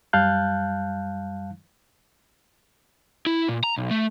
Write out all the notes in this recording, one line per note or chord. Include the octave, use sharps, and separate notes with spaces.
F#2 G3 F5 A5 F#6 G6
E4
A#2
A#5
B1
A3